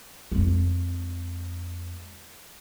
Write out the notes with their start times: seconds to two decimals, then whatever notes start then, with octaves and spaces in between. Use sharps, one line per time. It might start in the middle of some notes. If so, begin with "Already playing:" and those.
0.32 F2 G#3